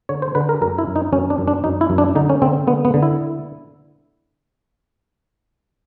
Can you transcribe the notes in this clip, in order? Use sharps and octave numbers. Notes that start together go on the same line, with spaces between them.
D3 C#5
C5
D3 B4
A#4
F#2 A#4
E4
F#2
D#4
F#2 C#4
D4
F#2
D4
F#2 D#4
E4
F#2
D4
D3 D#4
C#4
D3 C4
D3 B3
B3
D3
E4